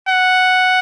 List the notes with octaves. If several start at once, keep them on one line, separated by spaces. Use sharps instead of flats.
F#5